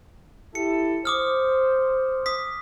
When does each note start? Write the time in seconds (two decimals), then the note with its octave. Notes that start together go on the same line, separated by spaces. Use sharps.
0.55 E4 G4 A4 C#7
1.05 C5 D6 D#6 F6
2.26 D#6 B6